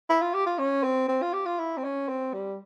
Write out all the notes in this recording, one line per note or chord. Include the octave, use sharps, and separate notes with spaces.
E4
F4
G4
F4
C#4
C4
C4
F4
G4
F4
E4
C4
C#4
C4
G3